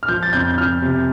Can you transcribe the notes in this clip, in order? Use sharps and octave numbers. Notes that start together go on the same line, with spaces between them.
F6
F3 G6
A6
F2 G6
G6
F2 F6
C3